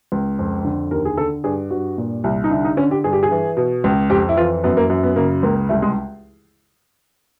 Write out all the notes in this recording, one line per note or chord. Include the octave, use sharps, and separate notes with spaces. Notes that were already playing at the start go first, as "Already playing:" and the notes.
C#2
F2
D3
D#2 A#4
G#4
D3 A4
G2 G#4
G2 F#4
A#2
C2
D#4
D3 E4
D#4
D3 C#4
G4
G2 G#4
G4
G#4
E3
B2
C#2
F2 G4
E4
E3 F4
F#2 B3
A#3
F#2
B3
C#3 A#3
C#2 A#3
C2 A3
G#3